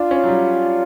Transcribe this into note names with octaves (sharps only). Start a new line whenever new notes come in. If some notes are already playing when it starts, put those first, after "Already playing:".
Already playing: D4 F4
C#4
F#3
G3